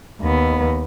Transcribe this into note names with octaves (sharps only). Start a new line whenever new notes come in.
D#2 B3